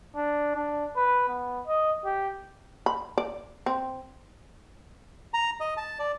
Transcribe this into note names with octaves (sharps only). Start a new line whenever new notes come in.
D4
D4
B4
B3
D#5
G4
B5
D5
C4
A#5
D#5
A5
D5